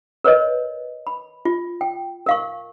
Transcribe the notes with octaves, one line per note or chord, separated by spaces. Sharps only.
A#4 B4 C#5 D#5
B5
F4
G5
A#4 F5 C#6